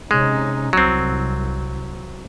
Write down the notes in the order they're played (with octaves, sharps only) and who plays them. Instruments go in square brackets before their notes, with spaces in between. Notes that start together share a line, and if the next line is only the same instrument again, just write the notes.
[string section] C3 C#4 D#4 [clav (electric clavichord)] G#3
[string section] C2 [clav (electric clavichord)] F#3 C4